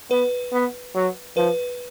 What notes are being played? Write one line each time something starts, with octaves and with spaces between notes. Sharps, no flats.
B3 B4
B3
F#3
F3 B4